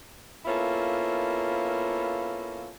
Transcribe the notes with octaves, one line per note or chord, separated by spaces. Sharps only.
A#3 B3 C#4 E4 F4 A4